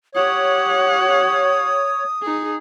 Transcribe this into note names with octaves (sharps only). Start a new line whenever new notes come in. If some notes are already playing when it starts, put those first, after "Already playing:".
G4 C#5 F#5 D#6
D#4 G#4